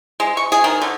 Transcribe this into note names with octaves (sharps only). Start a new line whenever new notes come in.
G#3
C#6
G#4
D#3
D3